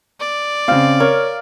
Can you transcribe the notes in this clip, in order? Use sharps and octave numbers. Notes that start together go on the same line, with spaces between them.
D5
C#3 C4 F5
A#4 C#5